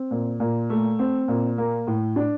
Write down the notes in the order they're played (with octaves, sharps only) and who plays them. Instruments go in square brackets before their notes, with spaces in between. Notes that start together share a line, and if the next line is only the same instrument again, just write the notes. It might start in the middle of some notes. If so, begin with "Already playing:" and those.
Already playing: [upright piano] C4
A#2
A#2
A3
C4
A#2
A#3
A2
D4